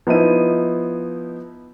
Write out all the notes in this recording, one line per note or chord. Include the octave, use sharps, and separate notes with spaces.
F3 B3 D#4 E4 D#7